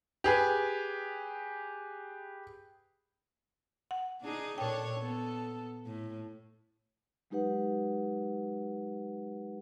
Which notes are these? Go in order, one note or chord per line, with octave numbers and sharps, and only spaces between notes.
G4 G#4 B4
F#5
D4 D#4 G#4
A#2 D4 A4 C#5 G5
B3 A4
A2
F#3 G#3 D#4 G4 B4 F#5